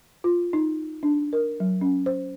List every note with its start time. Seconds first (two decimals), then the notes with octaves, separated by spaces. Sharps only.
0.24 F4
0.53 D#4
1.03 D4
1.33 A#4
1.60 F#3
1.81 C#4
2.06 C5